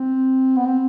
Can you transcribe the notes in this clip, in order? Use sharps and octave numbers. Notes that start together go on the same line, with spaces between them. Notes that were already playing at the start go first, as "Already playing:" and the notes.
Already playing: C4
B3
C4